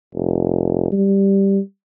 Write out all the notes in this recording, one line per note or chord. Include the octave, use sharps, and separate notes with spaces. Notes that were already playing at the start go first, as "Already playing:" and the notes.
F1
G3